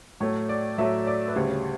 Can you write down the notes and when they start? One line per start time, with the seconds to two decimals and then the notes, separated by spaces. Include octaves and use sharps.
0.20 A2 F#3 A3 C#5
0.49 D5
0.78 A2 F#3 A3 E5
1.07 D5
1.28 B4
1.36 D2 C#3 G3 C#5